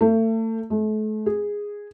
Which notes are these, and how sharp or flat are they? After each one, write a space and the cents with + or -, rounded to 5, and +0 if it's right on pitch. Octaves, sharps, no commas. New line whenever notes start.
A3 +35
A3 -35
G#4 -10